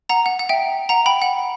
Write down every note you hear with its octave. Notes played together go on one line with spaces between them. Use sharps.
F#5 A#5
F#5
F#5
E5 G5
F#5 A#5
G5 B5
F#5